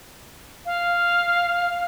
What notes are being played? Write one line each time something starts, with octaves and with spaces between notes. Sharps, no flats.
F5